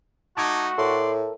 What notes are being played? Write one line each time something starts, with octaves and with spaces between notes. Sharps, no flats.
A3 D#4 F#4 A5 D6 G#6
A2 A4 A#4 D5 C6